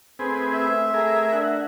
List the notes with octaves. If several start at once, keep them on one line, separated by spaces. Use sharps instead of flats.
A3 C4 G#4 B4
E5
A3 G#4 A#4
D4 F#5